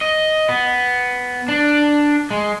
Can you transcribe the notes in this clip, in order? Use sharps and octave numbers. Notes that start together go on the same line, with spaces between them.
D#5
B3
D4
G#3